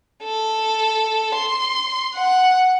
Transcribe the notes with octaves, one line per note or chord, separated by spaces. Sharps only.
A4
C6
F#5